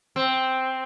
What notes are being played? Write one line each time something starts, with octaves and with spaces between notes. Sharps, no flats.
C4